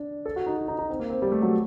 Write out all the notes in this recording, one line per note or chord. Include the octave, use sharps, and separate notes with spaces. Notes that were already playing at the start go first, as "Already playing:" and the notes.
Already playing: D4
A4
F#4
D#4
F#4
D#4
D#4
C4
A#3
C4
G3
A3
F#3